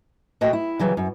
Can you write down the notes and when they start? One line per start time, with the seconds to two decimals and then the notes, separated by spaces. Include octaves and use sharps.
0.41 A#2 A3 F#4 D#5 G5
0.53 E4
0.79 C#3 E3 F#3 G3
0.97 F#2